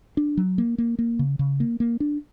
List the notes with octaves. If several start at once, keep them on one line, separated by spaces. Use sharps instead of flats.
D4
F#3
A#3
A#3
A#3
C#3
C#3
A#3
A#3
D4